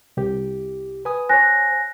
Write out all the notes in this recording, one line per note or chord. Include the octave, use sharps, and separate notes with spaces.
C2 G4
B4 G#5 D#6
C5 C#5 G#5 F#6 A#6